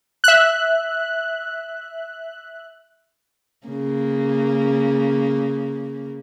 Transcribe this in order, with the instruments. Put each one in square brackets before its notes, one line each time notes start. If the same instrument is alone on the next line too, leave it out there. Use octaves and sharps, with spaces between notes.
[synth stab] E5 F#6
[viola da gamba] C#3 A#3